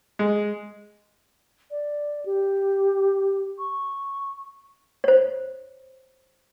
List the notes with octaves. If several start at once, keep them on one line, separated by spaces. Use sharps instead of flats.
G#3
D5
G4
C#6
C5 C#5